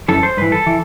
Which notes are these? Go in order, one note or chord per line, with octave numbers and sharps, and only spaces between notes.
F#2 E3 A4
C5
G2 E3 B4
A4
E3